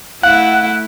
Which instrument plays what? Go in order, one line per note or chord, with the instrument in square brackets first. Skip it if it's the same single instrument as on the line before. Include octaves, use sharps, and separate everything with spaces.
[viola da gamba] A3 E4 [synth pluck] F5 [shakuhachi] F#5 [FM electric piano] F#6